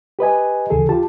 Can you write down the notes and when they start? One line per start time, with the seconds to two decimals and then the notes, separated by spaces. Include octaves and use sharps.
0.19 G4 B4 D#5 G#5
0.70 D2 C#3 E3 G#4 A4
0.89 F4 G4 A5